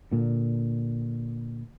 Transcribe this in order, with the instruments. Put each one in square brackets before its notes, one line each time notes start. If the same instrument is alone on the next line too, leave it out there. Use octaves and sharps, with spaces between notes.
[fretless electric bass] A#2 D3